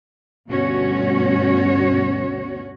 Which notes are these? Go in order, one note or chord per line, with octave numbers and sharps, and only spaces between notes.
D2 G2 B2 C#4 F#4 C#5